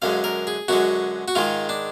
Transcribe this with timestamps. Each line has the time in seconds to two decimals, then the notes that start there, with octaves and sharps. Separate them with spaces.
0.02 F#2 D3 G#3 F5
0.24 A#4
0.47 G#4
0.68 F#2 D3 G#3 F#4
1.28 F#4
1.35 G#2 D#3 G#3 F4
1.69 D4